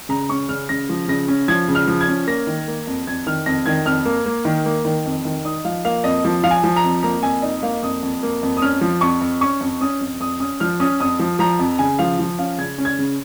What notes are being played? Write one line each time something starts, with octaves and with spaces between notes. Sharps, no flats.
C#3 A#5
C#4 C#6
C#3 F6
C#3 A#6
F3
C#3 A#6
C#4
F3 G#6
C#3
F6
F3
G#6
C#4
A#3 A#6
D#3
A#3
F2
F2 G#6
D#3 F6
F2 A#6
D#3 G#6
F2 F6
A#3
A#3
D#3
A#3
D#3
F2
D#3
D#4 D#6
F3 F5
A#3 F5
F2 D#5
F3
F3 F5
G#5
F3
A#5
F2
A#3 A#5
F2 G#5
D#4 D#5
A#3 F5
F2 D#6
F2
A#3
F2
D#6
C#4 F6
F3
F2 C#6
F2
C#4 C#6
F2
C#4 D#6
F2
F2 D#6
C#4 D#6
F3 F6
C#4 D#6
F2 D#6
F3
F3 A#5
F2
C#3 G#5
F3 F5
F3
C#4 F5
C#3 G#6
C#4
G#6
C#3